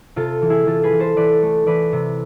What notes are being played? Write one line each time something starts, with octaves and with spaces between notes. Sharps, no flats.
C3 F4 A4
E3
E4 G#4
E3 F4 A4
G#4 B4
E3
A4 C5
E3 B4 D5
A3
E3 B4 D5
C3